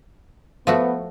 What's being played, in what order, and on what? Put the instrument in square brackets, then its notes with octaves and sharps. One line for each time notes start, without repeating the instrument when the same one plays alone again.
[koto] F3 A3 F#4 [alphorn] B3